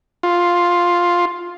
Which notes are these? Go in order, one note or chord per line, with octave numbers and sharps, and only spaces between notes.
F4